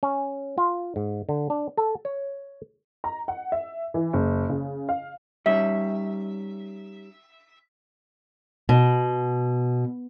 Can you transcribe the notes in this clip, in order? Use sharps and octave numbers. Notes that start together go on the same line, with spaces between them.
C#4
F4
G#2
D3
D4
A4
C#5
A#5
F#5
E5
E3
F#1
C#3
F5
G3 C#4 D#4 E5
B2